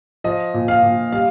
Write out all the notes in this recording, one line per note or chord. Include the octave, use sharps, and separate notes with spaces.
F3 D#5
A#2
F5
A#2
G3 F5